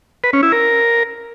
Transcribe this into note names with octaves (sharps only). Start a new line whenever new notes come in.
B4
C#4
E4
A#4